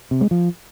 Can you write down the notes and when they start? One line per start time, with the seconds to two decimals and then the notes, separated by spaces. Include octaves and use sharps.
0.11 C3
0.21 G#3
0.31 F3